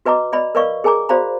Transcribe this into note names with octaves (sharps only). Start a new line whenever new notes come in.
F#4 B4 D#5 A#5 D6
D5 D#5 B5
A#4 B4 D5 D#5 F5 C#6
G#4 A#4 G#5 A#5 D6
F#4 C5 D5 F5 A#5 B5